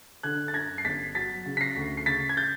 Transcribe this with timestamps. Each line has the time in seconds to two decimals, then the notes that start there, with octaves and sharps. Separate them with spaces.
0.23 D3 F#6 G#6
0.48 A6
0.54 F#2 G#6 A#6
0.78 C7
0.85 G1 A6 B6
1.15 F#3 A6 B6
1.46 C#3
1.57 B6
1.61 A#6 C7
1.76 D2
1.97 C7
2.06 C#3 A6 B6
2.29 G#6
2.37 G6 A6